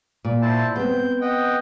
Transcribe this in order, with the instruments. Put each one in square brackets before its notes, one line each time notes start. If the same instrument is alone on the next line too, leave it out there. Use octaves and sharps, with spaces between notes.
[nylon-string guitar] A#2
[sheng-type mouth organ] E4 C5 A5
[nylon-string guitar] B3 C4 [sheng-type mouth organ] G6
[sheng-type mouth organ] D#5 F#5 G5